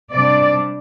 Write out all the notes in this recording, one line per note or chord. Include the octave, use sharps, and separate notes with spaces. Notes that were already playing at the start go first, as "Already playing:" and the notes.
C3 G3 D4 D5